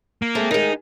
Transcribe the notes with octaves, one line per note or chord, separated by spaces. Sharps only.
A#3
G#3 A3 C4
D#3 G#3 D#4